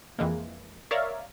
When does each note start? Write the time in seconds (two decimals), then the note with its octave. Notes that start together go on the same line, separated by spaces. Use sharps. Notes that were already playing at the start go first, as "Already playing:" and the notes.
0.19 F2 E3 G#3 A#3
0.91 A#4 C#5 D5 E5 F5